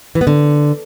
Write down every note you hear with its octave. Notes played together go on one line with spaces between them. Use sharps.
E3
B3
D3